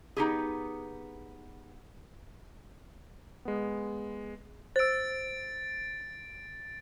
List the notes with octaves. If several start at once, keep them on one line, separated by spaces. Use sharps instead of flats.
B3 D#4 G4 G#4
G#3 B3
C5 E6 A6 D7